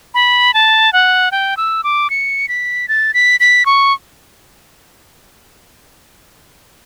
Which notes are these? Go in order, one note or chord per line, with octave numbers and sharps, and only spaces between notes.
B5
A5
F#5
G5
E6
D6
C#7
B6
A6
B6
B6
C#6